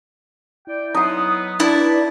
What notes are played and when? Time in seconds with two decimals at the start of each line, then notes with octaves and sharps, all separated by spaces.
0.67 E4 D5 G5
0.94 F#3 B3 D#4 C6
1.60 D4 E4 B4 D5 A5